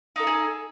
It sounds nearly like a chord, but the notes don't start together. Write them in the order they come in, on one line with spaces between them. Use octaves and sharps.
D#4 A4 E4 G#4